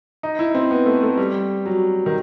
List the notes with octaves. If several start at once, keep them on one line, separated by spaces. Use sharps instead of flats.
D#4
E4
C4
B3
A3
A3
G3
F#3
D#3